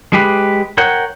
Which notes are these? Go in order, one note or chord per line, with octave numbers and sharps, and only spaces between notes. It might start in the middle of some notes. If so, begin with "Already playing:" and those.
G#3 G4 B4
A#4 C#5 F#5 G5